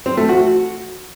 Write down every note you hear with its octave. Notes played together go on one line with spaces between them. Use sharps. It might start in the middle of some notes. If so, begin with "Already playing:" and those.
C4
A3
F#4